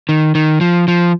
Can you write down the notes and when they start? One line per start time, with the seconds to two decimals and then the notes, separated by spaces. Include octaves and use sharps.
0.09 D#3
0.35 D#3
0.61 F3
0.88 F3